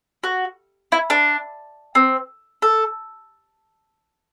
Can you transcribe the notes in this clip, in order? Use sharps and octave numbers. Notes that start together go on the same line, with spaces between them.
F#4
E4
D4
C4
A4